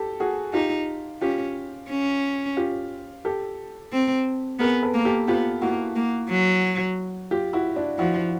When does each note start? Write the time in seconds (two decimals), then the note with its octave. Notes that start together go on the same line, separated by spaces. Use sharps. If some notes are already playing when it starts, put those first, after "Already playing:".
Already playing: G4 A4
0.20 F#4 G#4
0.54 D#4 F4 G4
1.21 C#4 F4 G4
1.90 C#4
2.57 F4 G4
3.25 G4 A4
3.92 C4
4.60 B3 G#4 A#4
4.83 A4 B4
4.94 A#3
5.05 G4 A4
5.28 B3 F4 G4
5.61 A#3 E4 F#4
5.96 A#3
6.30 F#3
7.31 F4 G4
7.53 E4 F#4
7.76 D4 E4
7.98 F3 E4 F#4